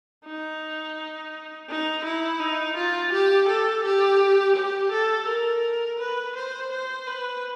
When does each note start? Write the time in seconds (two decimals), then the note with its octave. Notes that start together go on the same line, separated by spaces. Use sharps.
0.26 D#4
1.70 D#4
2.05 E4
2.40 D#4
2.77 F4
3.13 G4
3.49 A4
3.85 G4
4.56 G4
4.92 A4
5.28 A#4
5.99 B4
6.36 C5
6.72 C5
7.07 B4